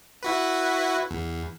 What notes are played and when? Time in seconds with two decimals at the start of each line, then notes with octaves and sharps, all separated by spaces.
0.23 E4 F#4 B4
1.11 E2